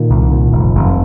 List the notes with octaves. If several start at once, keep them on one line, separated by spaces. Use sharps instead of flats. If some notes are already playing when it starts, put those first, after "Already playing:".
Already playing: A#2 D#3
C2
A#2
F1
F1